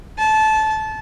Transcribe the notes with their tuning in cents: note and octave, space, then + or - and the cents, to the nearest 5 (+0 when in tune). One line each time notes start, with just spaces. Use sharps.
A5 -20